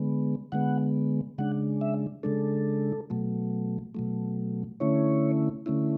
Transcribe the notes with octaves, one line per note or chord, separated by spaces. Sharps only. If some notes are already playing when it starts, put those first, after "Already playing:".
Already playing: D3 G#3 B3
D3 G#3 B3 F#5
C#3 G#3 D4 F#5
E5
C#3 G#3 D4 A4
B2 F#3 A3
B2 F#3 A3
D3 A3 C#4 E4 C#5
D3 A3 C#4 E4